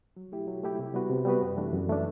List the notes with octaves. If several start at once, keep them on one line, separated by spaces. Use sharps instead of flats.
F#3
A3 E4 G4
F#3
A3 E4 G4
C3
G3 B3 F#4 B4
C3
G3 B3 F#4 B4
F#2
E3 A3 D4
F#2
E3 A3 D4